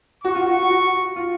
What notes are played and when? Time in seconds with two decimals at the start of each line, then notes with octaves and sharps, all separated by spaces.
0.24 F#4 C#6
0.35 F4
0.46 F#4
0.70 F#4
1.16 F4